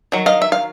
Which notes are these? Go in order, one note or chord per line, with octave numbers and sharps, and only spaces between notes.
D#3 F#3
D#5 F5
E5
F5